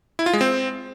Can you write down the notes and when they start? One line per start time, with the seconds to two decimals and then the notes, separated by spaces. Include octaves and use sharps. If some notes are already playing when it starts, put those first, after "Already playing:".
0.19 E4
0.26 F4
0.33 G#3
0.41 C4